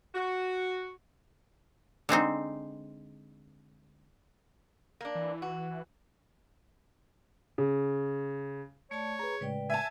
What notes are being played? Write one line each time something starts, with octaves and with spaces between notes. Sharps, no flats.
F#4
D3 G#3 C4 D#4
A#3 D4
E3
F#4
C#3
A3 C#5 D5 A5
G#4 B4 A#5
A2 C#3 G#3 B4 D5 G5
E5 G#5 A5